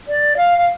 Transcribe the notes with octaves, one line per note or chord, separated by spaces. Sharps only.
D5
F5
F5